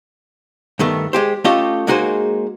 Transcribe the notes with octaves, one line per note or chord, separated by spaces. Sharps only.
G2 D#3 A3 B3
G#3 G4 C5
A3 C#4 F4 G4 A4 D#5
G#3 A#3 D#4 F#4 G#4 C5